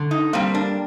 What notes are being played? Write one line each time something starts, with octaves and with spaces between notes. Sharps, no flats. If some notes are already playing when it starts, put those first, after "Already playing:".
Already playing: D3
D#4
G3 A#3 C4
D4